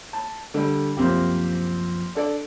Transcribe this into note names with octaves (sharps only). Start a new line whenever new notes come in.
A5
D3 G3
C2 F#2 F3 A#3 C4 G4
D4 A4 D5